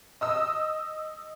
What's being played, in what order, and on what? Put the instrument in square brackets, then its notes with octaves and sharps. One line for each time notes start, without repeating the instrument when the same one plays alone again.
[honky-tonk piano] D#5 D#6 E6